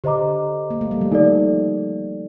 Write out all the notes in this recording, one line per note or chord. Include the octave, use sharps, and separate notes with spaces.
D3 G4 C5 D#5 A#5 D6
A#3
A3
G3
F3
D#3 D#4 A4 D5